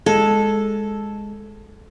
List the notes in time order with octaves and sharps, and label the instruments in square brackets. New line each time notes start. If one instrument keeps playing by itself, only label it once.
[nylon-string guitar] G#3 [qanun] A4